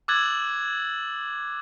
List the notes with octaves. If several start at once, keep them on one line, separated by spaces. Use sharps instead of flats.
D6 E6 F#6 G#6 A6 F#7